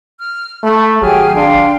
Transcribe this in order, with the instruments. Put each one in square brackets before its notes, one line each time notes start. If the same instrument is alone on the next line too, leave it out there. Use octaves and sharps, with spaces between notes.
[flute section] F6
[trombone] A3 [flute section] E5 B5
[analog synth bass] G#1 [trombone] F#3 [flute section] G4 G#4 F6
[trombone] D4 [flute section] F5 G5 C6